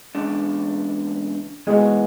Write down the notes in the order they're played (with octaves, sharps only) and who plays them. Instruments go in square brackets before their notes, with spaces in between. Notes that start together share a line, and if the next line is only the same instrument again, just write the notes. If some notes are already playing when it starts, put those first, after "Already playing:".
[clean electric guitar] E2 C#3 G#3 D4
[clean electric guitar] G#2 E3 B3 F#4 [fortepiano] G#3